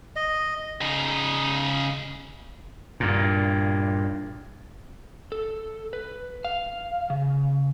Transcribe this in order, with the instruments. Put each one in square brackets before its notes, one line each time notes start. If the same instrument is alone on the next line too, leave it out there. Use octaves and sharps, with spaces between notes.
[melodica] D#5
[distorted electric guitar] C#3 D#4
[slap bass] G2 A#2
[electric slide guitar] A4
B4
F5
C#3